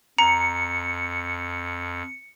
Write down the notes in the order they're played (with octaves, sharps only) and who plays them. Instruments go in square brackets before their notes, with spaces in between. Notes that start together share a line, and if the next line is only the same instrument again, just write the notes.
[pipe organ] F2 [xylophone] A#5 [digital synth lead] C#7